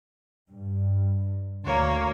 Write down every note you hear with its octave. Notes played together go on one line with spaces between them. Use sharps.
G2
D2 A#3 C#5